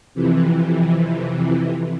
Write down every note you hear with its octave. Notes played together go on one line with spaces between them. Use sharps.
F2 C3 E3